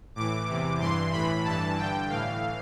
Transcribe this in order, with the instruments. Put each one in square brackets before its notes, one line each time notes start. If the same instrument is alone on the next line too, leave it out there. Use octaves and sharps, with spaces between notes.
[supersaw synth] A2 E3 D6
E2 C3 E3
G2 E3 C6
A2 E3 B5
G2 E3 A5
G2 D3 G5
A2 E3 F5